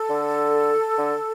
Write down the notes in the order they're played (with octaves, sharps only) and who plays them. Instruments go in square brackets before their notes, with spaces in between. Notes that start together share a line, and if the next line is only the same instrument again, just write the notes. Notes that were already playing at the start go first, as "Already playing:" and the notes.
Already playing: [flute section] A4
[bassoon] D3
D3